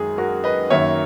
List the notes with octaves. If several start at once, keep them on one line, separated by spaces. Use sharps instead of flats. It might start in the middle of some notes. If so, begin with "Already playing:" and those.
Already playing: F#2 D#3 G#3 G#4
F#4 A#4
B4 D#5
F#2 D#3 A#3 C#5 E5